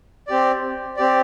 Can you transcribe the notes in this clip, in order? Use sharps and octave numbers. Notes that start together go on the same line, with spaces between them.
C4 G4 D5
C4 G4 D5